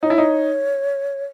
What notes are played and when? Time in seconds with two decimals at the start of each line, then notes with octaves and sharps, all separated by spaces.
0.03 D#4 C#5
0.10 E4
0.18 D#4